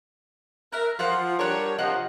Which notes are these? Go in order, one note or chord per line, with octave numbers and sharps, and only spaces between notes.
A#4 E5 F#6
F3 F4 F#5
G3 D4 A#4 C#5 F#5
C3 F3 D#5 F#5 F#6